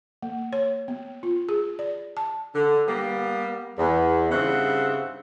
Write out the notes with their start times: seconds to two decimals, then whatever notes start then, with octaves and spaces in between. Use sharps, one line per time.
0.23 A#3
0.53 C#5
0.88 B3
1.23 F4
1.49 G#4
1.79 D5
2.17 A5
2.55 D3
2.88 G3 A#3 B3
3.78 E2
4.32 G2 C#3 C4 D#4 E5 F#5